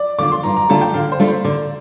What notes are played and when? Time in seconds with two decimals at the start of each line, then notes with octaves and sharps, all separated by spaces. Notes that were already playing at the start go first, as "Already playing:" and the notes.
Already playing: D5
0.19 D3 A3 D4 F4 D6
0.32 C6
0.43 G2 A#5
0.57 A#5
0.69 D3 A3 D4 F4 A5
0.81 G5
0.94 D3 F5
1.12 C5
1.19 A3 D4 F4
1.28 C5
1.44 D3 D5